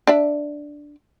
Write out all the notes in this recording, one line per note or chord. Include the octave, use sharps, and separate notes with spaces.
D4 D5 E5